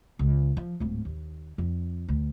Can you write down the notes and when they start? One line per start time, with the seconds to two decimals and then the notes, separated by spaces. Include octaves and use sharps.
0.19 C#2
0.57 F3
0.80 D1 G#2
1.05 D#2
1.58 F2
2.08 D2